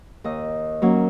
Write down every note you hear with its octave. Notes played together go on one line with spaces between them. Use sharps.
D#2 D#5
F#3 A#3 C#4